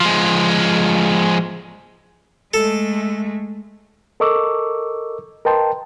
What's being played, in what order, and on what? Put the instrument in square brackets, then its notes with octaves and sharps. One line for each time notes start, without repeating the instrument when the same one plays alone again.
[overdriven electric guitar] F3 G#3
[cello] G#3 A3 [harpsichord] A4
[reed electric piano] A4 A#4 D#5 C#6 D6 E6
A#4 B4 D#5 G5 A5 C6